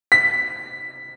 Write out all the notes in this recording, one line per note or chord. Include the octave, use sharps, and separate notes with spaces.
B6